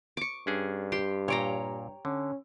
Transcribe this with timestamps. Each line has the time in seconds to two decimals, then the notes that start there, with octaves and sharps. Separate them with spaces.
0.17 C#6 D6
0.47 G2 C#4 D4 G#4
0.92 G4 C6
1.28 A#2 C#5 F5 G5 A#5
2.05 D3 C#4